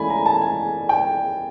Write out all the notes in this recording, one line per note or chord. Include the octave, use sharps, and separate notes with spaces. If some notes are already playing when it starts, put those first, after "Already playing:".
Already playing: E3 A3 C#4 D5 G#5 B5
A#5
A5
G#5
G5